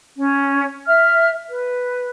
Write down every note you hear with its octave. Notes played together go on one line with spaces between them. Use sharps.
C#4
E5 F6
B4